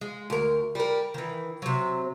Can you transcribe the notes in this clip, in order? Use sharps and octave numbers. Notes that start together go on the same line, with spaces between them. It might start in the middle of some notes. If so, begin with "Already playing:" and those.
G#3
D2 A#4
G3 A#4
D#3 E3
C3 F#3